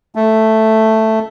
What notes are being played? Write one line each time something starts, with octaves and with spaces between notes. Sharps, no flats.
A3